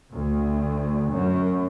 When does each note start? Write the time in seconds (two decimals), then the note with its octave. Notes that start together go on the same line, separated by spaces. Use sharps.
0.14 D2
1.12 F#2